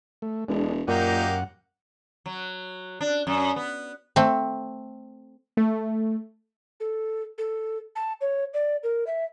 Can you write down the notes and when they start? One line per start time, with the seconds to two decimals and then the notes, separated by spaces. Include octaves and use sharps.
0.22 A3
0.48 E1 G#3 D4
0.88 F#2 A#2 A#3 D#4 G4 F#5
2.26 F#3
3.01 D4
3.27 F#2
3.56 B3
4.16 A3 C4
5.57 A3
6.80 A4
7.38 A4
7.96 A5
8.21 C#5
8.54 D5
8.83 A#4
9.07 E5